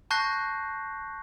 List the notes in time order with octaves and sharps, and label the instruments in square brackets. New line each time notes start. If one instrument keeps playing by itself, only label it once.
[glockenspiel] A5 C#6 F#6 G6 A#6 C7